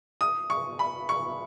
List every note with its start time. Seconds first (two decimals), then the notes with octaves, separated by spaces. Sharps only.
0.21 D#6
0.50 C#6
0.79 B5
1.09 C#6